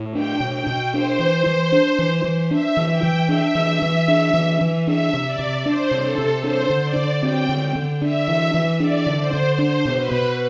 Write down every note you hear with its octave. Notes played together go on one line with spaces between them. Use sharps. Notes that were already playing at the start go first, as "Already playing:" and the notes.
Already playing: A2
D4 G5
B2
G5
B2
D4 C5
E3
E3
D4
E3
E3
D4 E5
E3
G5
E3
D4 E5
E3
E3
D4
E3
E3
D4 E5
C3
D5
C3
D4 C5
C3
A4
C3
D4 C5
D3
D5
D3
C4 G5
D3
D3
D4 E5
E3
E3
D4 D5
D3
C5
D3
D4 C5
B2
B4
B2